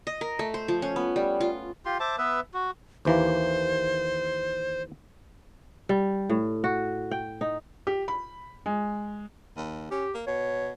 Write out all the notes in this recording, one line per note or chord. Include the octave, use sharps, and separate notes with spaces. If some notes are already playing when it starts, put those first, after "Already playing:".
D#5
A#4
A3
C5
F3
C#4
B3
G3
F4
F4 G4 C6
C5 E5 A5 D6
B3 B4 E5
F#4
D#2 E3 A#3 C5
G3
A2
F#4
G5
D#4
G4
B5
G#3
D#2
C#4 G4
A#3
B2 C#5